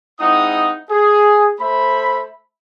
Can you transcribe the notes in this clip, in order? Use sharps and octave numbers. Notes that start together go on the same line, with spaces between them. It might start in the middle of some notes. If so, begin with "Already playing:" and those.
G#3 C4 D#4 E4 F#5 D#6
G#4
A3 C5 E5 B5